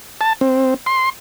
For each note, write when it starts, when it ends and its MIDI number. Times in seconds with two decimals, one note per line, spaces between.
0.21 0.33 81
0.41 0.74 60
0.86 1.10 84